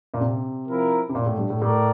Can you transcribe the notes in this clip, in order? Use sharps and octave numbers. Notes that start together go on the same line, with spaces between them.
A#2
C3
F3 C4 E4 A#4
C3
A#2
A2
G2
A2
A2 A#4 D5